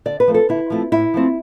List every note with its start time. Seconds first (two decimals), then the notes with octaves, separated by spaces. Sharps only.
0.06 D3 D5
0.20 B4
0.28 F3 A3 C4
0.34 A4
0.49 D3 E4
0.70 F3 A3 C4
0.92 A2 E4
1.14 F3 A3 C4